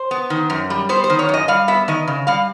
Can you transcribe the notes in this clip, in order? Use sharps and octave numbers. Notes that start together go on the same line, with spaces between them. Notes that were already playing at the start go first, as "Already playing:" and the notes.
Already playing: C5
B3
D#3
F#2
G3
B3 C5
C5
D#3
C#5
F#2
D#5
G3 F5
B3 E5
D#3 D#5
C#3
G3 F5